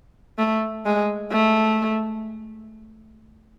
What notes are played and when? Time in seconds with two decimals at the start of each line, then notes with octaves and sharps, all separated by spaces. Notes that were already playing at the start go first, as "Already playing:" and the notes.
0.38 A3
0.86 G#3
1.32 A3